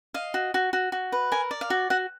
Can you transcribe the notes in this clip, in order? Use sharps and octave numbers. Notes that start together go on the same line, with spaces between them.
D#5 F5
F#4
F#4
F#4
F#4
B4
A#4 G#5
D5
F5
F#4
F#4 F#5